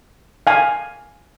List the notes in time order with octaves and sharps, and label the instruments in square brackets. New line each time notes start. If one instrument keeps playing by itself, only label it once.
[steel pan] F5 G#5